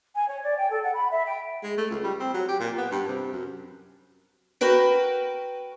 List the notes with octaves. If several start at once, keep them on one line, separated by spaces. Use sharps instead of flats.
G#5
C#5
D5
G5
A4
F#5
B5
E5
G5
G#3
A3
C#2
G3
C4
F#3
G4
A#2
B3
G2
C3
F#2
F#4 A#4 B4 G5